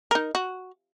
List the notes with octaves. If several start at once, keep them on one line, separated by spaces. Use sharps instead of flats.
D#4 A#4
F#4